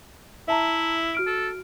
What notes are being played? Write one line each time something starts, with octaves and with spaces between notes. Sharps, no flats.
E4 E5 A5 A#5
F#4 F6 D7
A4